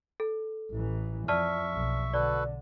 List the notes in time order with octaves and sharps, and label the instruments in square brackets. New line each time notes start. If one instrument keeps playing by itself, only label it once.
[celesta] A4
[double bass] A1 E3
[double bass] F2 [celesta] D5 A5 F6 [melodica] E5 C#6
[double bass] B1
[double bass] D3 [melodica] F#4 A4 B4 [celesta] D5